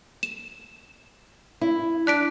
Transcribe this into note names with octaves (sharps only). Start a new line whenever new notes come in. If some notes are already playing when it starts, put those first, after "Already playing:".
E7
E4
D4 F#6 B6 D7